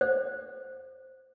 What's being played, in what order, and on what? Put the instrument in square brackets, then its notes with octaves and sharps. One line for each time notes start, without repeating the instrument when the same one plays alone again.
[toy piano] C5